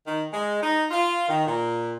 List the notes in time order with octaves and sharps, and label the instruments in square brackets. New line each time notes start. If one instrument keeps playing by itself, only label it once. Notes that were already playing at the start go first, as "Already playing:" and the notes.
[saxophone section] D#3
G#3
D#4
F4
D#3
A#2